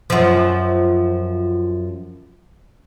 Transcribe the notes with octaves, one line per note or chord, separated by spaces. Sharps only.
F#2 F3